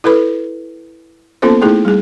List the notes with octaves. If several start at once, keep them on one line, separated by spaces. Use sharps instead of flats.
E4 A4 B4 B5
A#3 B3 C#4 F4 A4 C5
A3 D#4 E4 G#4
G3 G#4